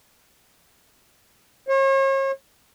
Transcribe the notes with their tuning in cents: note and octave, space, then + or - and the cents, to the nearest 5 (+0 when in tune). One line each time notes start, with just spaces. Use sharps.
C#5 -40